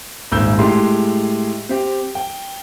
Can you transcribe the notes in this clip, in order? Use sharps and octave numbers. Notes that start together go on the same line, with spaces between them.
D#1 G#1 E6 G6
A2 G#3 G4 C6
C4 G4
G5